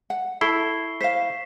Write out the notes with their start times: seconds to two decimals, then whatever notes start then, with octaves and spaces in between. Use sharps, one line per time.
0.10 F#5
0.41 E4 A4 C#6 C7 G7
1.01 C5 F5 B6 C7 E7